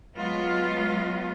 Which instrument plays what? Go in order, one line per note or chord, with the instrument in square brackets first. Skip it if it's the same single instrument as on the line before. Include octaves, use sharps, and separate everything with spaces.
[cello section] F#3 G#3 B3 F4